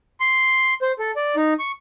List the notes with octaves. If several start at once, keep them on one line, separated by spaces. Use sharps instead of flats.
C6
C5
A4
D5
D#4
C#6